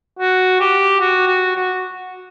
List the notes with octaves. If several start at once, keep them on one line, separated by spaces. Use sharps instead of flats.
F#4
G4
F#4
F#4
F#4